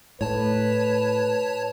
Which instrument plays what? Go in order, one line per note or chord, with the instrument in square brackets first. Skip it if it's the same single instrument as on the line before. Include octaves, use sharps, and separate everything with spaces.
[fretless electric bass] A2 [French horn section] B4 [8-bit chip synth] C#5 A5